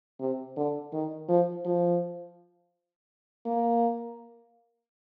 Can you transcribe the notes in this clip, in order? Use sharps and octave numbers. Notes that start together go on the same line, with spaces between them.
C3
D3
D#3
F3
F3
A#3